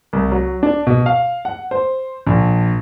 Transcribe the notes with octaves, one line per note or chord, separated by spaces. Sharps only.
C2
F#3
D4
B2
F5
F#5
C5
A#1